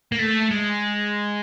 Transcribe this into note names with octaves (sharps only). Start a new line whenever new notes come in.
A#3
A3
G#3